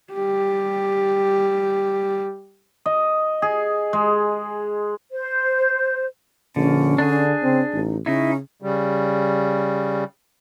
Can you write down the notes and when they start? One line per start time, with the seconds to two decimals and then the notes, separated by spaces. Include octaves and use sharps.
0.13 G3 G4
2.86 D#5
3.42 G#4
3.93 G#3
5.11 C5
6.56 A#1 D3 C#4
6.98 D3 D4 G#4
7.43 C#3 C4
7.73 A1 D#4
8.06 C#3 C#4 D#4 E4
8.62 C#3 G3